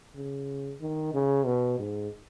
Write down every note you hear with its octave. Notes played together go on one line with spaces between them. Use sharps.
C#3
D#3
C#3
B2
G#2